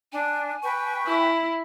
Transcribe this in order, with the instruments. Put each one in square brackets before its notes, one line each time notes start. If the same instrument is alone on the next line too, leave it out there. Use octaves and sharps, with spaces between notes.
[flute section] D4 [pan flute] G#5
[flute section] B4 G5 C#6
[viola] E4